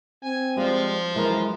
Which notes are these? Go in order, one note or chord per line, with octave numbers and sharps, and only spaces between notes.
C4 G#5
F3 G3 G#3 F4 G4
F#2 E3 G#3 A#4